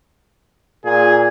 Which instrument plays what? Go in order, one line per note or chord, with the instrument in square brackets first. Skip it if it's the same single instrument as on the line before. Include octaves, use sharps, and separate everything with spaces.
[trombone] A#2 [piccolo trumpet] G#4